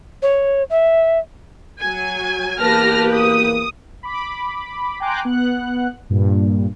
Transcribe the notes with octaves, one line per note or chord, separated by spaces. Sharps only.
C#5
E5
F#3 G#5
E2 A#3 G4 B4 A5 F6 A#6
D#6
B5 D6
G5 G#5 A#5 C6 D6 F#6
B3 F#5 F#6
G2 A#2